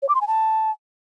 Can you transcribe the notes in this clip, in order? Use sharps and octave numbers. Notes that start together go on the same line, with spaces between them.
C#5
D6
C6
G#5
A5